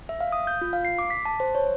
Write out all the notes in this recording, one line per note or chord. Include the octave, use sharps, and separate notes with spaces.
E5
F5
D#6
G6
F4
F5
C7
D6
B6
A5
C5
C#5